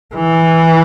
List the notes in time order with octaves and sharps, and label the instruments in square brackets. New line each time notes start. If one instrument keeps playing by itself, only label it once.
[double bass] E3